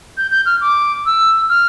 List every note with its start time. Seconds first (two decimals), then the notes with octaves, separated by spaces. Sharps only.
0.17 G6
0.31 G6
0.46 F6
0.61 D6
1.06 E6
1.49 F6